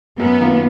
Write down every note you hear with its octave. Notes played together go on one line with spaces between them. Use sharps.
F#2 B3
D#3 A#3 F4